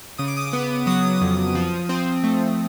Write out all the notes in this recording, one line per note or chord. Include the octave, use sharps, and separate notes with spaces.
C#3 D#6
D6
D#6
B3
F#3 D#6
F2
F3
C4
A3